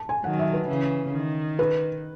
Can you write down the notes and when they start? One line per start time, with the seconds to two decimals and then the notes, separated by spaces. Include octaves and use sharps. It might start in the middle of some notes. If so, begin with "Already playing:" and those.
Already playing: A5
0.09 G#5
0.24 D#3 F#3 F#5
0.39 E5
0.54 B4
0.69 C#3 E3
1.13 D#3
1.59 B4